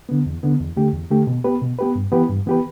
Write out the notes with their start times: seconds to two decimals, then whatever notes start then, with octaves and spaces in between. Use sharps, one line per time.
0.09 D3 B3
0.26 E2
0.43 D3 B3
0.60 E2
0.77 D3 A3 G4
0.93 E2
1.11 D3 A3 G4
1.27 B2
1.44 B3 G4 B4
1.62 B2
1.79 B3 G4 B4
1.96 G2
2.12 E3 B3 G4 B4
2.29 G2
2.46 E3 B3 G4 B4